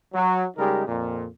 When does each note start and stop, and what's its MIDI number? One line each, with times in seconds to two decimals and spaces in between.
0.13 0.44 54
0.57 0.84 49
0.57 0.84 55
0.57 0.84 56
0.57 0.84 63
0.57 0.84 67
0.57 0.84 70
0.87 1.25 41
0.87 1.25 46